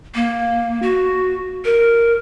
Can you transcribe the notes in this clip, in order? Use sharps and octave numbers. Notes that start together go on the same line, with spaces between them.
A#3
F#4
A#4